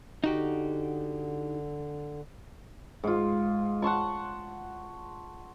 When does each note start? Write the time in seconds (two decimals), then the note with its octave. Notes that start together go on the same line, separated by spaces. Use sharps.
0.24 D3 D#4 F#4 G4
3.03 G#2 F4
3.82 F#5 A5 C6 C#6